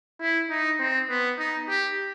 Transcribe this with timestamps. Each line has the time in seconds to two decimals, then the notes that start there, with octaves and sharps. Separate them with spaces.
0.21 E4
0.50 D#4
0.79 C4
1.09 B3
1.39 D#4
1.69 G4